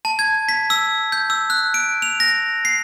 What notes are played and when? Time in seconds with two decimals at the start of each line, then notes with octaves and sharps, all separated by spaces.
0.05 A5
0.19 G#6
0.49 B6
0.70 E6
1.12 G6
1.30 E6
1.50 F#6
1.74 D7
2.02 F7
2.20 A#6
2.65 C7